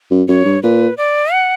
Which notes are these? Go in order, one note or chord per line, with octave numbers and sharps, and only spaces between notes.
F#2
F#2 C#5
G2
A#2 B4
D5
F#5